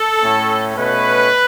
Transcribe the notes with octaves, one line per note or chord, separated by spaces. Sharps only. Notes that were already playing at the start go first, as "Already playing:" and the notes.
Already playing: A4
A2 A3 C#4
B2 A3 C#4 B4